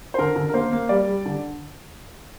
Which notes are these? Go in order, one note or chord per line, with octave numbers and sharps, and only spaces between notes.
C5
D3 A#4
D3
A#4
A#3 C5
A#3
G3 D5
G3
D3